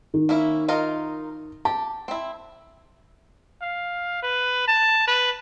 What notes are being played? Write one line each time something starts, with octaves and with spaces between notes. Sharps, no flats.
D#3
A#3 C#4 E4
D#4 F4 A#4
G4 A5
C4 E4
F5
B4
A5
B4